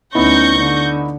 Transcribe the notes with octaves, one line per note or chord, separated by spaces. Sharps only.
D2 B3 C#4 D#4 E4 C#6 G6 A#6
D3